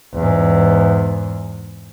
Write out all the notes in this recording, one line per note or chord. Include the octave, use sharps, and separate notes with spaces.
E2 G#2